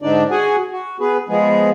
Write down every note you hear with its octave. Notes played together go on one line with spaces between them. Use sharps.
G#2 D3 D4 D#4 D5
F#4 G#4 F#5 G#5
F#4
B3 G#4 B4
F3 G#3 B3 G#4